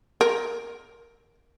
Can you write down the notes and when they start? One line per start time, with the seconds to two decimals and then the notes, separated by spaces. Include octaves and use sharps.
0.21 A#4